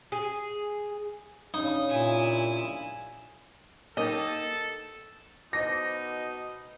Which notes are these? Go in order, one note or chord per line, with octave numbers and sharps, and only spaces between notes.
G#4
G2 C#3 D#4
A#2 E4 G#5
A#3 D#4 G4 A4 D#5
B2 D#4 C5 D#5 D6 A#6